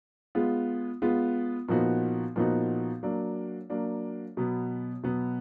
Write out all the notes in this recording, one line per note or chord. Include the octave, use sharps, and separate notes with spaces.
G#3 B3 F4
G#3 B3 F4
A#2 F3 B3 D#4 F#4
A#2 F3 B3 D#4 F#4
F#3 A#3 D4
F#3 A#3 D4
B2 F#3 B3
B2 F#3 B3